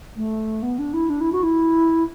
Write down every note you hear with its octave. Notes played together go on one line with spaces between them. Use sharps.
A3
B3
D4
E4
D4
E4
F#4
E4